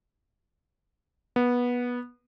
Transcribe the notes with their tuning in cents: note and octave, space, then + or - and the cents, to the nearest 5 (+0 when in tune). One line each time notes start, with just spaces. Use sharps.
B3 -15